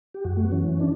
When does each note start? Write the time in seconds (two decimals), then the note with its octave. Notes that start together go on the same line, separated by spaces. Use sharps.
0.14 G4
0.24 F#2 F#4
0.37 A3
0.44 B3
0.52 E3 C#4
0.80 D4